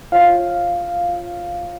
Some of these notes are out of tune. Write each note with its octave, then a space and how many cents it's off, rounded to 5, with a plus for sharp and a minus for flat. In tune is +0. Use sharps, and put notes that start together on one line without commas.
F4 +0 C#5 -35 F5 +0